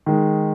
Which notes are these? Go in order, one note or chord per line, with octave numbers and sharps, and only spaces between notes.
D#3 G#3